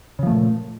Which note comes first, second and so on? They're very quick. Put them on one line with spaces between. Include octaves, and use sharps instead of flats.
C#3 F3 A3 A#2